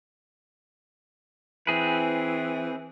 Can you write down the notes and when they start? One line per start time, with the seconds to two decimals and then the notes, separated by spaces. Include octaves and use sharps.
1.67 E3 C4 G#4 B4